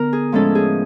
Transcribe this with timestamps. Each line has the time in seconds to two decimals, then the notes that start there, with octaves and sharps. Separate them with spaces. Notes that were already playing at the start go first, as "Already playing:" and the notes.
Already playing: D3 B3 A#4
0.13 G#4
0.32 A2 F3 G#3 C#4 A4
0.55 G#4